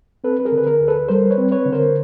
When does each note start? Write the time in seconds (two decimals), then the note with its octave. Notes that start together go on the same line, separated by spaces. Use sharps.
0.24 C4 A4 B4
0.40 B4
0.45 G#4 A#4
0.52 D3
0.58 B4
0.67 G#4 A#4
0.81 D2
0.88 A4 B4
1.08 G3 A#4 C5
1.30 B4 C#5
1.38 C4
1.51 B4 C#5
1.66 D3
1.72 A#4 C5